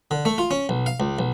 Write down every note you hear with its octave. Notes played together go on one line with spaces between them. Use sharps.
D3
A3
F4
C#4
B1
F5
C#2
B1